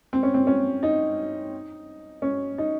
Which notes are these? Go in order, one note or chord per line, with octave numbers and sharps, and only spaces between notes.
C4
C#4
C4
C#4
D#4
C#4
D#4